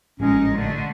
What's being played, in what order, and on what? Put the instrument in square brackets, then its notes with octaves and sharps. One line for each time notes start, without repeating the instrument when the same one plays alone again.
[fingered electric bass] A1 A#2 [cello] G#3 D#4 [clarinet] C#4
[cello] D3 A3 [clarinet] G#3